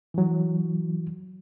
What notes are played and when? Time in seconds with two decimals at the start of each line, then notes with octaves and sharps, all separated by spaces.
0.14 E3 F#3